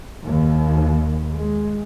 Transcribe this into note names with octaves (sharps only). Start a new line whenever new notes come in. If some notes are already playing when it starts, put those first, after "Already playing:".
D#2
G#3